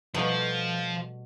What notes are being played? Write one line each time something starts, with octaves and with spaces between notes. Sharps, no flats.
B2 F3 G3 A3